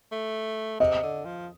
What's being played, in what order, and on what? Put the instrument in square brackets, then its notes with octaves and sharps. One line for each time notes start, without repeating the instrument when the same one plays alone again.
[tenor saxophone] A3
[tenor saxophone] C3 [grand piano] D#5
[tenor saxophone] D3
F3